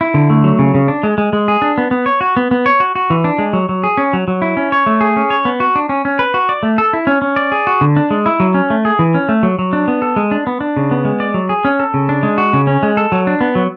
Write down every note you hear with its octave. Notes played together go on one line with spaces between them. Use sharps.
E4
D3
A3
F#3
C#3
C#3
D4
G#3
G#3
G#3
G#4
D4
B3
B3
C#5
F#4
B3
B3
C#5
F#4
F#4
E3
D4
G#3
F#3
F#3
G#4
C#4
F#3
F#3
E4
C#4
C#5
A3
G#4
C#4
C#5
B3
F#4
D4
C#4
C#4
B4
F#4
D5
A3
A4
E4
C#4
C#4
D5
G#4
F#4
D3
D4
G#3
E4
F#3
C#4
A3
G#4
E3
C#4
A3
F#3
F#3
D4
B3
A4
G#3
D4
B3
D4
C#3
B3
G#3
D5
F#3
G#4
C#4
A4
C#3
D4
G#3
F#4
C#3
C#4
G#3
A4
F#3
D4
B3
F#3